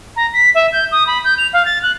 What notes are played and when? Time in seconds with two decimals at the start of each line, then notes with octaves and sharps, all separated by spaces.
0.16 A#5
0.33 B6
0.54 E5
0.72 G6
0.91 D#6
1.07 B5
1.24 G6
1.38 F7
1.53 F5
1.65 A6
1.82 F#6